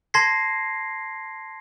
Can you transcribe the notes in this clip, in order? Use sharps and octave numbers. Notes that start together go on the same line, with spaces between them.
A5 C6 G#6 A#6 C7